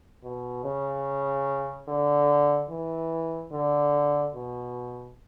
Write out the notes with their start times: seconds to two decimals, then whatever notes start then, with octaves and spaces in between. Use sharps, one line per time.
0.23 B2
0.64 C#3
1.88 D3
2.70 E3
3.52 D3
4.35 B2